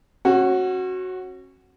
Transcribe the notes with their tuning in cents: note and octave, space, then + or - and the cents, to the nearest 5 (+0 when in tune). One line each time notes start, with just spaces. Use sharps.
C#4 -35 F#4 +0